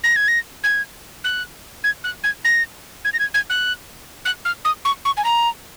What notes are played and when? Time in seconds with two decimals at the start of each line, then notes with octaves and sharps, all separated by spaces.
0.04 A#6
0.16 G#6
0.28 A#6
0.64 G#6
1.24 F#6
1.84 G#6
2.04 F#6
2.24 G#6
2.45 A#6
3.05 G#6
3.13 A#6
3.19 G#6
3.34 G#6
3.50 F#6
4.25 F#6
4.45 F6
4.65 D#6
4.85 C#6
5.05 C#6
5.17 G#5
5.25 A#5